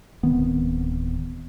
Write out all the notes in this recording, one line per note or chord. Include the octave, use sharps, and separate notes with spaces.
D1 D#3 B3 C4